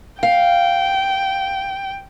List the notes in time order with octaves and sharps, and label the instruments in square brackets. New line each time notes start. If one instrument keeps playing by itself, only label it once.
[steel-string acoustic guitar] F5 [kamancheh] G5